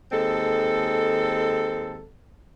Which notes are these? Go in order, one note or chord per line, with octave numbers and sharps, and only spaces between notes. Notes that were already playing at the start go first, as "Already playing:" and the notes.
D#2 G#3 C4 A4